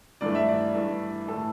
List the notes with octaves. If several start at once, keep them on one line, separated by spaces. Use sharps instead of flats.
G2 E3 A3 D5
E5
D5
G2 E3 A3
A2 E3 A3 A4